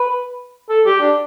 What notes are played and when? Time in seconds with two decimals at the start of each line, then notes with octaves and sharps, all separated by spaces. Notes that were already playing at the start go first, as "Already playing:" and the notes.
Already playing: B4
0.69 A4
0.86 G4
1.01 D4